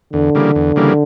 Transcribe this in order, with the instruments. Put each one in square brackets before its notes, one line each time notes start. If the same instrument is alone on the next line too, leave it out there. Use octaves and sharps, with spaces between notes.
[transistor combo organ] E2 [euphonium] D3
[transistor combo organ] C#3 E3 G3 A#3
E2
C#3 E3 G3 A#3